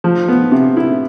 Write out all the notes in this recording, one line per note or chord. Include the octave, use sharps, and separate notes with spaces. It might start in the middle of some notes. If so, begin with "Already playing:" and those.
F3
B3
C3
E4